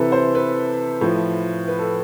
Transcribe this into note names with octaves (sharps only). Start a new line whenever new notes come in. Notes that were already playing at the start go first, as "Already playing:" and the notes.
Already playing: C3 E3 A4 B4
C5
B4
A2 F3
B4
A4